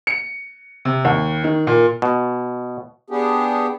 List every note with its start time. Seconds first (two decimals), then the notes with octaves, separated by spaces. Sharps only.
0.07 C#7
0.85 C3
1.05 D#2
1.44 D#3
1.67 A#2
2.02 B2
3.10 B3 D4 G4 G#4